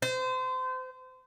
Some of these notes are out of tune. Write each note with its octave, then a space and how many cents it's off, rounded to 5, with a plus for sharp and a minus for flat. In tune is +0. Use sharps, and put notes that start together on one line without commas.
C5 -30